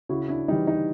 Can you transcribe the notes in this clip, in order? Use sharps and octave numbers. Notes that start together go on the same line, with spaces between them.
C#3 E4 F#4
D4 E4
E3 G3 D#4
D#4